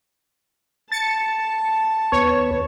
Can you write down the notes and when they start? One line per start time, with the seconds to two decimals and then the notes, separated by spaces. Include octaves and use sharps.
0.92 A5 A6 C#7
2.12 D#2 B3 B4 C#5 C#6